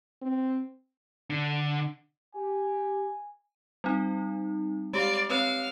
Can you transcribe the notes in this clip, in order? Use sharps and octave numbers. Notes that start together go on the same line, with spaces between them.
C4
D3
G4 G#5
G3 C4 D#4
G#3 G4 D5 F5
C4 B4 C#5 F5